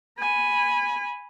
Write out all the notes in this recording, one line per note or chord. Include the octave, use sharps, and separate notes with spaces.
G#5 B5